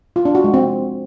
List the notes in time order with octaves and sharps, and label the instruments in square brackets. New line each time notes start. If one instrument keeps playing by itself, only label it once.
[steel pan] F4
D4
F#4
G#3
C4